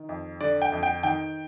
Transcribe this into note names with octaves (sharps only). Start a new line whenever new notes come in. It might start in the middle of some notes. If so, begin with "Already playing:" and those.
Already playing: D#3
F2
D3 D5
G5
F2
G5
D#3 G5